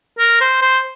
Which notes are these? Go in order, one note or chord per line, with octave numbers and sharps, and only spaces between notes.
A#4
C5
C5